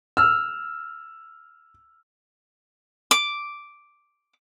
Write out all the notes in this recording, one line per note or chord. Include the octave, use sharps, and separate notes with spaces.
E6 F6
D6